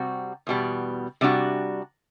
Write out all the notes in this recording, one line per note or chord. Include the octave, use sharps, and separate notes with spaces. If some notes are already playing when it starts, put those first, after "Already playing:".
Already playing: C3 G3 C4 F#4
E2 B2 G3
C3 G3 D4 F#4